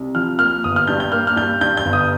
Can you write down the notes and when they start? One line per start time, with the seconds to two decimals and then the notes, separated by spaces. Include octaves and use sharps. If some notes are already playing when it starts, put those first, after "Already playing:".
Already playing: C2
0.15 F3 F6
0.39 A#3 F6
0.64 G1 D#6
0.76 F6
0.87 G2 G6
1.00 G6
1.12 A#3 F6
1.27 F6
1.36 G2 G6
1.61 G2 G6
1.77 G6
1.85 G1
1.93 D#6